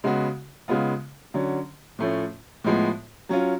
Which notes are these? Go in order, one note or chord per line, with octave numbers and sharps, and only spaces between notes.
C#3 G#3 B3 F#4
C#3 G#3 B3 F4
D3 F#3 C#4
A2 F3 A3 C#4
A2 F3 G#3 B3
F#3 C#4 F4